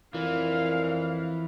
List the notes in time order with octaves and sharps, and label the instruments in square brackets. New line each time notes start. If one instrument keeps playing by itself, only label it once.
[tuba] F2 [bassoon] A#2 [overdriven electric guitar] E3 [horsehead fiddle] F5